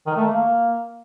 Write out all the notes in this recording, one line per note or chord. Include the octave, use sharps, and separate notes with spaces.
D#3
A3
A#3